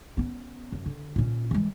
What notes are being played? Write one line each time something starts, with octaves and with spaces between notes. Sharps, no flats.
B3 C#4
F#2
D3
A#2 C#4
E3 G#3